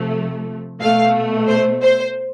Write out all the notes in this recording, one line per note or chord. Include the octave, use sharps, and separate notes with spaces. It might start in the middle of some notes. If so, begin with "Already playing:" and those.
Already playing: C3 F3 A3
B2 A3 F5
C5
C5